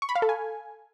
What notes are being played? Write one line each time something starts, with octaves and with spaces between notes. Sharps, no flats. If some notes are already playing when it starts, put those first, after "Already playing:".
C#6
B5
F5
A4
G#5